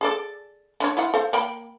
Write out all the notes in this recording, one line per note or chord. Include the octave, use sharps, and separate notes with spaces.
G#4 A4 D5
D3 F4 C#5
E4 F4 F#5
A4 C5 F5
A#3 G5 B5